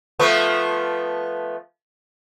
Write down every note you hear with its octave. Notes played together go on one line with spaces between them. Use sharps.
F3 A3 B3